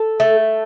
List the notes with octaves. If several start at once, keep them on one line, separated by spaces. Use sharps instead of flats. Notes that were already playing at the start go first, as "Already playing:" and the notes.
Already playing: A4
A3